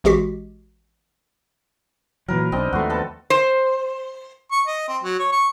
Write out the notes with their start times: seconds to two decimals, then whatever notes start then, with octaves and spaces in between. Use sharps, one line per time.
0.04 A1 G#3 F#4 G4 B6
2.28 A#2 E3 F#3 A#4 B4
2.52 B1 C4 D4 D#5
2.73 D#2 F3 A3 F#4 C6
2.90 B3 A4 A5
3.30 C5
4.52 C#6
4.67 D#5
4.88 C4
5.03 F#3
5.19 C#5
5.32 C#6